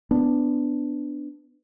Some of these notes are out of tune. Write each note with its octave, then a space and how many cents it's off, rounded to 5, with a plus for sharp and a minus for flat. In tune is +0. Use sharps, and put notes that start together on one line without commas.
B3 +15 D4 +0